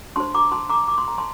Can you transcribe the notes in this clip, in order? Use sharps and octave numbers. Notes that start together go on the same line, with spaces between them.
D4 G4 C5 A5 C6
A#5 D6
A5 C6
A#5 D6
D6
C6
A#5
A5 C6